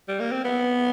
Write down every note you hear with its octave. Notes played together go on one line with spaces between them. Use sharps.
G3
A#3
C4
B3